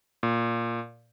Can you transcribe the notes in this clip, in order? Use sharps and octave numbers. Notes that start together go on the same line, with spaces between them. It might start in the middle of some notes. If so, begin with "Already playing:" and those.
A#2